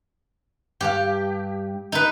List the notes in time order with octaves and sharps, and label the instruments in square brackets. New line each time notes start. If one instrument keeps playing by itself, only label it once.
[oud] G2 F5 [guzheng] G4
[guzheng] D#4 B4